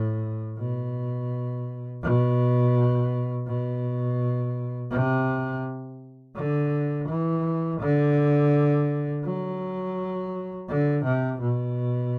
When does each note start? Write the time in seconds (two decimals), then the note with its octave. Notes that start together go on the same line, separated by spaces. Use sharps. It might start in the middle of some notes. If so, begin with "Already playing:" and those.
Already playing: A2
0.58 B2
2.02 B2
3.47 B2
4.91 C3
6.35 D3
7.08 E3
7.80 D3
9.24 F#3
10.69 D3
11.04 C3
11.41 B2